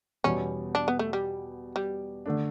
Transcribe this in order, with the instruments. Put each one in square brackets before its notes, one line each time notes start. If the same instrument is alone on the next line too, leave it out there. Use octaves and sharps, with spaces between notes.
[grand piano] E2 B2 G3 [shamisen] C#4
[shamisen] D4
B3
A3
G3
G3
[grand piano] D3 A3 D4